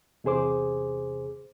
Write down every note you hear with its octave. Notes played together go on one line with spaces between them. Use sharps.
E2 C3 G#4 C5 D6